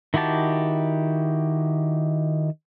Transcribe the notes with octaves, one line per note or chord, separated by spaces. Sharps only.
D#3 E4 F#4 G4 A5